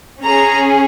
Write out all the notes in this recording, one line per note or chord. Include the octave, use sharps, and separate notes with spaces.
C#4 G#4 A#5